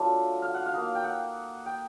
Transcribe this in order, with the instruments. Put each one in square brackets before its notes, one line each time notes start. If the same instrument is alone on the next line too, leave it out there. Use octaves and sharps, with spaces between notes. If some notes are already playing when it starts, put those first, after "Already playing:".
Already playing: [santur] F#3 A3 D4 F4
F5
F#5
F5
A#3 D#4
G5
F#5
G5